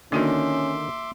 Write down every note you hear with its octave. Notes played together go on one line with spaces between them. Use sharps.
D3 D#3 A#3 C#4 F#4 E5 C6 D6